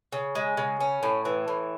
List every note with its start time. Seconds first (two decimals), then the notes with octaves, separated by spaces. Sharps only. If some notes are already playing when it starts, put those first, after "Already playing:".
0.12 C#3
0.35 G#3
0.57 C#3
0.81 C#4
1.03 A2
1.25 E3
1.48 A2